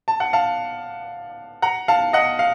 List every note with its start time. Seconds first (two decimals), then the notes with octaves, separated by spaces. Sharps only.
0.08 A5
0.20 F#5
0.33 F5 A5
1.62 F#5 A#5
1.88 F5 A5
2.13 D#5 F#5
2.39 F5